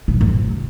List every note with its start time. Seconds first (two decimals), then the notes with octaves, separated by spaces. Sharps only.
0.08 B2
0.14 F3
0.21 A#2
0.27 C3